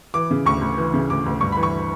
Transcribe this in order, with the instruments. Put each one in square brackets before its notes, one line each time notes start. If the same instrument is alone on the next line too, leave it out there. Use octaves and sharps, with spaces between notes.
[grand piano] E3 D6
C#3
D2 C#6
D2
E3
C#3
D2 D6
D2
G2 C#6
E3 B5
C#6